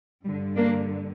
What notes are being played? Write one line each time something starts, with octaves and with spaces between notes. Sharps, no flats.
G2 G3
D3
A#3 D4